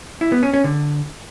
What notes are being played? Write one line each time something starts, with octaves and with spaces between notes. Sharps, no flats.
E4
B3
C#4
C#4
D3